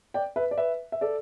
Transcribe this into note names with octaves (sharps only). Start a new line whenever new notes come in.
D5 G5
B4 E5
D5
B4 E5
E5
A4 D5